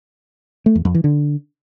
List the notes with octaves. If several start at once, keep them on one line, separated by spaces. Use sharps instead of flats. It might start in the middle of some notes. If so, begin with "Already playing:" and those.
A3
E2
F2
E3
D3